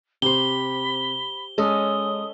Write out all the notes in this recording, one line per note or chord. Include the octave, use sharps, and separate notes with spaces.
C3 G4 C5 B5 G7
G#3 C#4 A4 D#5 D#6